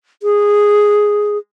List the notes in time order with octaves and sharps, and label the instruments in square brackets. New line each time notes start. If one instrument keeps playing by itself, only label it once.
[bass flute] G#4